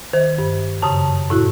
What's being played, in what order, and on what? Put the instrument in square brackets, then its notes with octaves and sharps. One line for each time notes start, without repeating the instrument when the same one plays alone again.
[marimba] D#3 [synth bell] C5
[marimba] G2
[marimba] F#2 C#3 D#6 [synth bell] A5
[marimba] A2 E4 F#4